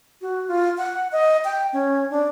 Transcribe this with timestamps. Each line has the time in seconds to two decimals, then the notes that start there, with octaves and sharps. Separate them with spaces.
0.21 F#4
0.48 F4
0.77 F#5
1.12 D#5
1.44 G5
1.73 C#4
2.11 D4